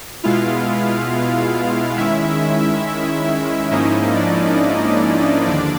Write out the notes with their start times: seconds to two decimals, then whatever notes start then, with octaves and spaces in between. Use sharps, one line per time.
0.23 B2 G#3 B3 E4 F4 F5
1.97 D#3 G#3 C#4 E4 E5
3.71 G#2 F3 A#3 C#4 D#4 E4 D#5
4.14 D4 D5
5.45 D#2 D3 F3 D4 D5